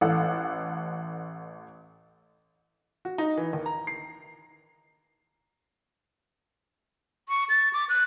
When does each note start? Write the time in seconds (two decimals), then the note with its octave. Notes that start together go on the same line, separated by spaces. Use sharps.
0.01 A1 A4 F5 F#5
3.05 F#4
3.18 D#4
3.37 E3
3.53 D#2
3.66 A#5
3.87 C7
7.29 C#6
7.49 A6
7.73 D6
7.89 F#6